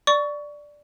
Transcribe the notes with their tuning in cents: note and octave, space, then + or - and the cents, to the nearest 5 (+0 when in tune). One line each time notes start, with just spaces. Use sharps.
D5 +0 C#6 +20